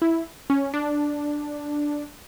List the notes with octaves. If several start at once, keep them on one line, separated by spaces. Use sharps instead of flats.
E4
C#4
D4